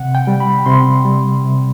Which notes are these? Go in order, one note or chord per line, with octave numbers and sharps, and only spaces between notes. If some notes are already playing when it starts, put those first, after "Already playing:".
Already playing: C3 F#5
G5
G3
B5
C3 C6
G3
C3